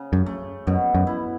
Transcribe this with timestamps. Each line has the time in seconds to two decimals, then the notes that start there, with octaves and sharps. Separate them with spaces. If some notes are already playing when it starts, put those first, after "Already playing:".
Already playing: C#3
0.13 F#2
0.26 A3
0.67 F#2 B2
0.95 F#2
1.07 E4